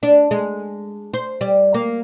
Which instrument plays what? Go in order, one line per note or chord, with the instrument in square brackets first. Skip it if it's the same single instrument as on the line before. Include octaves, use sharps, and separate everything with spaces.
[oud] D4
G#3
C5
G3
A#3